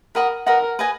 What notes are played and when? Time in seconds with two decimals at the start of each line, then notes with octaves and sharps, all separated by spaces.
0.15 A#4 B4 D#5 F#5 B5
0.46 A#4 B4 D#5 F#5 B5
0.79 B4 D#5 G#5